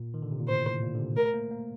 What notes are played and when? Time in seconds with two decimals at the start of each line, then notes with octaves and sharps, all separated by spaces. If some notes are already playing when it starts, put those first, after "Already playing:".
Already playing: A#2
0.14 D#3
0.22 D3
0.31 C3
0.39 A#2
0.48 A2 C5
0.65 A2
0.83 A#2
0.95 D3
1.00 C3
1.16 A3 A#4
1.34 A#3
1.51 A#3